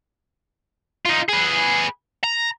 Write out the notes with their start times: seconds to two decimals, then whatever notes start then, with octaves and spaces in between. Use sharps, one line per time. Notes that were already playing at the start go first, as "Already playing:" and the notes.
1.06 D#4 F4
1.29 G#4 B4
2.24 A#5